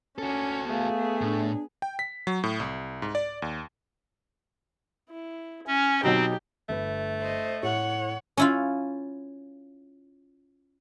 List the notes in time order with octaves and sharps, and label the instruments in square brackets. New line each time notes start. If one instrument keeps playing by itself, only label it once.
[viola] C#4 C#5 [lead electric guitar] F#4 A4
[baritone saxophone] A3 [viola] B3 G#4 [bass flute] F5
[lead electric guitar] A2 [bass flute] D4
[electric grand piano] G5
B6
F#3
A2
C2
G#2
D5
D#2
[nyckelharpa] E4
[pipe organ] C#4 [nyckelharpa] G#5
[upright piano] B2 F#3 D#4 [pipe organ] C4 [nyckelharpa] G4
[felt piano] G1 B4 [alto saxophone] A3
[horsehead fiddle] C5 D#5
[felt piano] A2 [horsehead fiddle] C#5 F#5
[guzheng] C#4 E4 F4